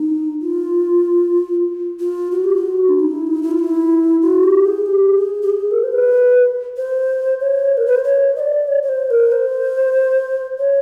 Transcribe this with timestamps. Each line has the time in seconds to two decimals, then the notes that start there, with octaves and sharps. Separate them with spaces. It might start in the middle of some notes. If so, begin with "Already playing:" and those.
Already playing: D#4
0.41 F4
2.00 F4
2.31 F#4
2.44 G4
2.56 F#4
2.88 D4
3.00 D#4
3.11 E4
3.27 D#4
3.43 E4
3.51 F4
3.59 E4
4.22 F#4
4.43 G4
4.65 G#4
4.86 G4
5.18 G#4
5.42 G4
5.50 G#4
5.71 A#4
5.83 C5
5.92 B4
6.77 C5
7.40 C#5
7.77 A#4
7.86 B4
7.95 C5
8.04 C#5
8.36 D#5
8.40 D5
8.68 C#5
8.82 C#5
8.89 C5
9.10 A#4
9.32 C5
10.59 C#5